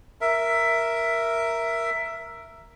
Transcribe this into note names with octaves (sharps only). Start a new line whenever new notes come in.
A#4 E5